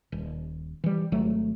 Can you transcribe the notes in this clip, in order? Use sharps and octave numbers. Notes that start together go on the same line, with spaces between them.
D#1
E3 G3
G#1 F#3 A3